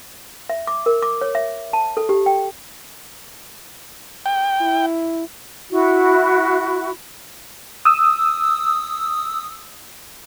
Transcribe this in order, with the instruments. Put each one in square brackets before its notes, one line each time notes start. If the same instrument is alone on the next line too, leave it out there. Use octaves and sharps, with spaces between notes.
[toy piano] E5
D6
A#4
D6
C#5
E5
A5
A4
G4
G5
[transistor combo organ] G5
[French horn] E4
[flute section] E4 F#4
[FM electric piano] D#6 E6